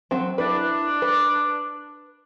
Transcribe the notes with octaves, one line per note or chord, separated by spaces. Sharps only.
F#3 C4
D4 E4 B4
B4